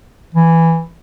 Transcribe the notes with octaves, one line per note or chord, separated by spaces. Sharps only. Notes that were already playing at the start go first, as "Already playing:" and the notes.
E3